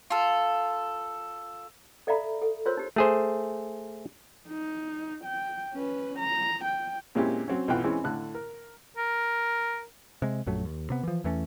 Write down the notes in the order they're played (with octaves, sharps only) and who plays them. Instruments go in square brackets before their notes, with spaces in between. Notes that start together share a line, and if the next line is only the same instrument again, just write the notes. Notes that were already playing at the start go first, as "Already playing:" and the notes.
[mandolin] F4 A4
[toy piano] A4 D5 E5 F5 A#5 B5
A4
F4 A#4 C5 C#5 C6 E6
D#4 G4
[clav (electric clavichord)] A3 G#4 C5
[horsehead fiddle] D#4
G5
C#4 B4
A#5
G5
[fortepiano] A#2 G#3 C4 C#4 E4 G4
F#3 C4 C#4
B1 E3 F4 F#4 G5 F#6
E3 G#3 C4 C#4
A2 D3 F#6
A#4
[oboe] A#4
[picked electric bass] C3 G#3
A#1 F#2 F#3 A3
D#2
C3 B3
E3 F3
E2 E3 A3 C#4